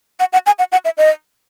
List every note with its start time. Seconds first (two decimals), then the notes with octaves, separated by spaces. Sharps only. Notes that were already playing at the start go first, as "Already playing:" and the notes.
0.20 F#5
0.33 F#5
0.46 G#5
0.59 F#5
0.72 F#5
0.85 E5
0.98 D#5